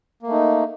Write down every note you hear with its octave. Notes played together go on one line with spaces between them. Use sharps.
A3 A#3 D#4